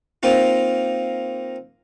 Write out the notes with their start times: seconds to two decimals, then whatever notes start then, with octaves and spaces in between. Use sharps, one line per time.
0.23 A#3 C4 D#4 F4